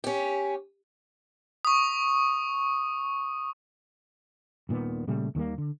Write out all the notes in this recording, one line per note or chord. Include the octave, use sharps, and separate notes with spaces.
C#4 G4
C#6 D#6
D#1 A#2 D#3 B3
A#2 C#3 G3 A3
D#2 D#3 G3 A#3
D3